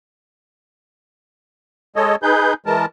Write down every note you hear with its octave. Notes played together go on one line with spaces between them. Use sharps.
G#3 A4 C#5 D#5
D#4 G#4 B4 G6
E3 G#3 A#4 A5